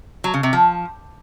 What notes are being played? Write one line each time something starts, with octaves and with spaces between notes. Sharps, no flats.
F#3
C#3
C3
F3